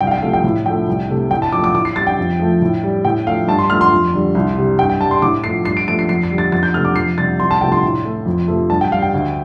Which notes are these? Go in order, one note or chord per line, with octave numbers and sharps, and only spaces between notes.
C2 G5
F5
G5
C3 F3 A3 F5
G5
A2
F3 A3 G5
C2
C3 A3
A2 G5
A5
F3 A3 D6
D6
A2 D6
C7
G3 A6
G5
F2
F3 A3
A2
G3
A2 G5
F3 A3 F5
G2 A5
C6
F3 A3 F6
C6
F2
D3 G3
C2
C3 G3
G2 G5
G5
G3 A5
C6
A2 D6
F3 A3 C7
G2 C7
D7
F3 A3 D7
C7
F2 C7
C7
D3 G3
A6
F2 A6
G6
C3 A3 F6
D6
F2 C7
C3 G3 A6
C2 C6
A5
C3 F3 A3 G5
C6
A2
A3
F2
C3 F3 A3
G2 A5
G5
G3 F5
G5
D2